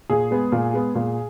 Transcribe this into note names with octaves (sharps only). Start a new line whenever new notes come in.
A#2 G#4
G#3 B3
A#2
G#3 B3
A#2